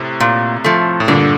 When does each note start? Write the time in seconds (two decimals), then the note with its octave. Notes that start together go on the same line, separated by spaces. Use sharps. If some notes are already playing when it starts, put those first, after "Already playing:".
Already playing: A2 C3
0.20 A#2
0.64 F3 A3
1.00 A2
1.08 G2 A#2 D3